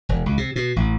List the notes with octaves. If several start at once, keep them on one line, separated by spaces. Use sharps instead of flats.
E1
C#2
C3
B2
A1